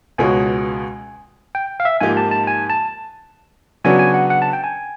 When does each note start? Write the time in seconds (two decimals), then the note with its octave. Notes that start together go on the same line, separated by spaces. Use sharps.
0.18 C#2 B2 G#3 C#4 F#4 G#5
1.55 G5
1.80 F5
1.85 E5
2.00 G#2 F3 A#3 D#4 G4 G#5
2.17 A5
2.31 A5
2.47 G#5
2.70 A5
3.84 C#3 F#3 B3 D4 F#4 G#5
3.99 G#5
4.14 F#5
4.30 F#5
4.42 A5
4.53 G5
4.64 G#5